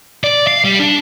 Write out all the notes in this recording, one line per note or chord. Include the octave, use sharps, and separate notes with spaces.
D5
F5
G3
D4